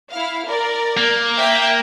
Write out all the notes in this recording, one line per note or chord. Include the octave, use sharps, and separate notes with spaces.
E4 F5
A#4 D5
A#3
E5 G5